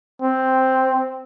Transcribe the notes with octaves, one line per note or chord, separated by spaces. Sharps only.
C4